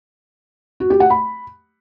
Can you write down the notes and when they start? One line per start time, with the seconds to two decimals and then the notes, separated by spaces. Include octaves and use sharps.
0.80 F#4
0.90 G4
1.00 F#5
1.10 B5